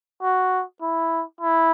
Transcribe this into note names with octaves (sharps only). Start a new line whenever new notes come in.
F#4
E4
E4